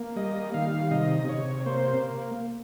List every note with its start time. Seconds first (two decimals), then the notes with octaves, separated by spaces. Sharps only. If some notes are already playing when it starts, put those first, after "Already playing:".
Already playing: A#3
0.16 G3 D#5
0.54 D#3 F5
0.91 C3 D#5
1.28 C3 C#5
1.66 A#3 C5